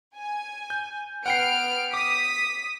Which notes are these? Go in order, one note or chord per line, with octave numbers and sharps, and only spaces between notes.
G#5
G6
B3 F#5 G5 F6 C7 D7
D6 D#6 B6